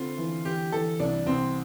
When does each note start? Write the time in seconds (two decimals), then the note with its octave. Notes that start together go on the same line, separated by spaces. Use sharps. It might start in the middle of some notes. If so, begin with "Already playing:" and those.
Already playing: D3 C4 F4
0.18 E3
0.45 E3 G4
0.72 E3 A4
1.00 C2 D4
1.26 C2 C4